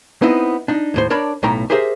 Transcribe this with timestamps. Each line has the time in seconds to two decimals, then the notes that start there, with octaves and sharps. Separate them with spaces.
0.22 B3 C4 D#4 E4 D#5
0.68 D4 D#4
0.94 D#2 A2 C5
1.10 D4 A#4 C#5 D5 A5 B5
1.43 B1 A2 A3 G5 A#5
1.70 G4 G#4 A#4 C5 E5